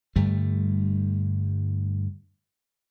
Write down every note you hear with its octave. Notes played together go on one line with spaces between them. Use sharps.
G2 D3 G3 A3